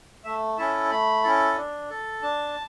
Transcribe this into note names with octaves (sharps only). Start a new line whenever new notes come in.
A3 E5
C#4 E4 A4 E5
A3 B5
C#4 E4 A4
D4
A4
D4 A5